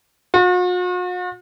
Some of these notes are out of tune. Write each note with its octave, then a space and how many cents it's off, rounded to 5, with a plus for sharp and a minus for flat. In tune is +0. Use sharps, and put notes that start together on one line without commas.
F#4 -45